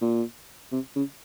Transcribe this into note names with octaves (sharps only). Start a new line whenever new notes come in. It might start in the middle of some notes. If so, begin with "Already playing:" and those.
A#2
C3
C#3